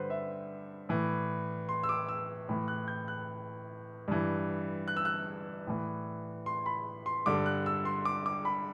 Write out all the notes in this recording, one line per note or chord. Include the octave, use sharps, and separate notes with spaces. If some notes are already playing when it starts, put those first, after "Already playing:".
Already playing: G2 D3 B4 C5
E5
A2 E3
C6
E6
D6
E6
A2 E3
F#6
G6
F#6
G2 E3
F#6
E6
F#6
A2 E3
C6
B5
C6
G2 D3 D6
F#6
E6
C6
D6
D6
B5